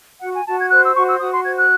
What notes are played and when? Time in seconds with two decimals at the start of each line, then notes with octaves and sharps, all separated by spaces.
0.21 F#4 F#5
0.33 G#5
0.46 F#4 A5
0.58 G#6
0.70 C5 F#6
0.82 E6
0.94 F#4 C#6
1.07 E6
1.19 F#4 D#6
1.32 C6
1.43 C5 G#6
1.56 F#6